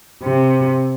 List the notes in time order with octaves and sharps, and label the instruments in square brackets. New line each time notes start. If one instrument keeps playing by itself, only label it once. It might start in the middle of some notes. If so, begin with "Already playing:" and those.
[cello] C3